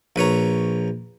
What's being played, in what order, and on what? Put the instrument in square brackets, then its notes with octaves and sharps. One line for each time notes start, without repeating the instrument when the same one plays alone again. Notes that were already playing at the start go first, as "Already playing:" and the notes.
[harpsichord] A#1 B4 C#5 A#5